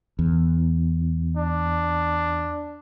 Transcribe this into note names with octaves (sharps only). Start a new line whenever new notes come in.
E2
D4